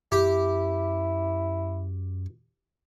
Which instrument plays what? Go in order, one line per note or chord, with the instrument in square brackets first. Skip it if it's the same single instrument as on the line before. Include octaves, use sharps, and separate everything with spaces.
[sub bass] F#2 [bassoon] E4 [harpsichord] G4